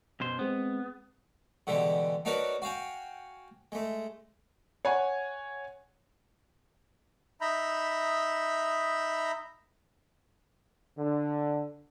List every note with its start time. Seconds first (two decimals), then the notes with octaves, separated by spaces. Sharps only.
0.20 F#2 B2 C5
0.39 G#3 B3 C4
1.67 B2 D3 E3 G3 G#3
2.25 D4 D#4 F#4 A#4 B4 C#5
2.62 F#4 F5 G5 G#5
3.72 G#3 A3
4.85 C#5 F#5 G#5
7.41 D#4 E5 A#5 B5 G6
10.98 D3